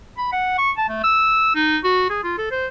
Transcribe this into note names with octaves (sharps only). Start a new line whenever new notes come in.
B5
F#5
C#6
A5
A3
E6
D#4
F#4
G#4
F4
A4
C5